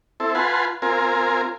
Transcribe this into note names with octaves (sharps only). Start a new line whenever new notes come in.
C4 E4 A4
F4 B4 F#5 G#5 A5 C6
C4 F4 A#4 G#5